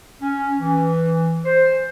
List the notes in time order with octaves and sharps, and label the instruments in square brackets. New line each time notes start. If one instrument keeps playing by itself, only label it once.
[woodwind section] C#4
E3
C5